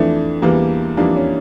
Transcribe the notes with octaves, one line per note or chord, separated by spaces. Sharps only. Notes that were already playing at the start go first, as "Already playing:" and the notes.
Already playing: F2 E3 A3 D4
E2 E3 G3 A#3
F2 E3 G3 A#3 D4
C#4